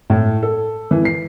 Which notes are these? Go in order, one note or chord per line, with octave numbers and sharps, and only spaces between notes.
A2
A4
E3
C7